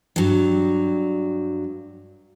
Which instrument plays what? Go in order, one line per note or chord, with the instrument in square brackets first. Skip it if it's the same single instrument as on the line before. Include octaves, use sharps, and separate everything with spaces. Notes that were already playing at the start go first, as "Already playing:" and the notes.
[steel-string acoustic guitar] G2 F#3